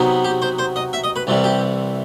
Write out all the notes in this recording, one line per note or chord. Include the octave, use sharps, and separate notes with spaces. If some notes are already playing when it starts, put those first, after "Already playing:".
Already playing: C3 F#3 B3 D#4
G4
C5
C5
D#5
E5
D#5
B4
C2 C3 E3 G3
G4